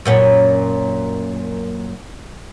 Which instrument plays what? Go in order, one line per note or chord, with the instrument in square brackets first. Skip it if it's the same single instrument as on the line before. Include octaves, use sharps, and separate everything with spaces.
[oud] F#2 A#2 C#4